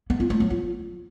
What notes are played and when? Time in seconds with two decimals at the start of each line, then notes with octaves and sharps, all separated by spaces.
0.10 B3
0.20 F4
0.30 A3
0.40 F#3
0.50 F4